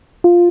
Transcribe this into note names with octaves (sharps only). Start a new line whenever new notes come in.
F4